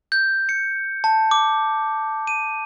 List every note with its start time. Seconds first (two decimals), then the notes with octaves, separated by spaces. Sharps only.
0.12 G6
0.49 C#7
1.04 A5
1.31 D6
2.27 D#7